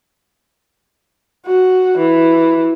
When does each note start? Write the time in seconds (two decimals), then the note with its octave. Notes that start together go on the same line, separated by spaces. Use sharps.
1.47 F#4
1.99 E3